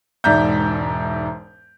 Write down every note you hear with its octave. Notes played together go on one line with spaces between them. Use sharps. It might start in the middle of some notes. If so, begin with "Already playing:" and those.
E1 G#2 D5 E5 A#5 G6